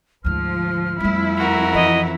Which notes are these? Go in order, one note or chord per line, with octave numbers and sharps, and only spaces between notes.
D2 G#2 F3 F6
F2 G3 A3 E4
F#4 A#4
E3 C#4 D#5